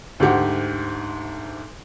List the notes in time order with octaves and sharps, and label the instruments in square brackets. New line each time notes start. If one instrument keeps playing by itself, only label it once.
[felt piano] D2 G#2 G4 F#5